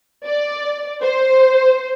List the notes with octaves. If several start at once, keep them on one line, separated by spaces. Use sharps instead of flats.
D5
C5